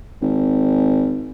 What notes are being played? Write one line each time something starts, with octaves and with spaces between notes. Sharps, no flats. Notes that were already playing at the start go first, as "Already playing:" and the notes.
G#1